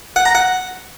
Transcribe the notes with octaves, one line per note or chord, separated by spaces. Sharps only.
F#5
A#5
F#5